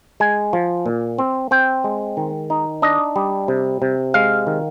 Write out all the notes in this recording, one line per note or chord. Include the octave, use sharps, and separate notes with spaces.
G#3 G#5
F3
A#2
C4
C4 G5
G#3
D#3
D#4
D4 D#5
G3
C3
C3
G#3 F5
D#3